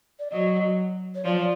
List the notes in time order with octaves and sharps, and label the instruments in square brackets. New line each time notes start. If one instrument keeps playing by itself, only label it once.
[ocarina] D5
[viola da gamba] F#3 [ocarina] D#5
[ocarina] C#5
[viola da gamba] F3 [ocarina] D5